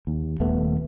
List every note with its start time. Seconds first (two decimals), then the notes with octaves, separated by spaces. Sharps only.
0.07 D#2
0.40 D#1 D#2 A3 B3